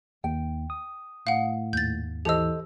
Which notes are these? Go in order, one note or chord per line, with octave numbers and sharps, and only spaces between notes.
D#2 G5
D#6
A2 F5 F#5
D#2 G#2 G6 A6
E3 G4 A4 C5 D#5 E6